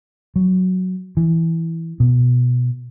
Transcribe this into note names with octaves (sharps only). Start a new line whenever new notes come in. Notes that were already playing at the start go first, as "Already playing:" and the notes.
F#3
E3
B2